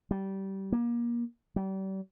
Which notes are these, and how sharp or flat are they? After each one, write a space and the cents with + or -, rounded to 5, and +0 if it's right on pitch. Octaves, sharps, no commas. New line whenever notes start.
G3 -20
A#3 +30
G3 -35